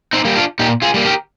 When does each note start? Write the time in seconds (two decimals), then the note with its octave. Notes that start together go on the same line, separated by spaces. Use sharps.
0.13 C4 D#4
0.25 G3 A#3
0.36 D4 F4
0.59 A#2 D#4 G4
0.82 F4 G#4
0.94 G3 A#3
1.05 G4 A#4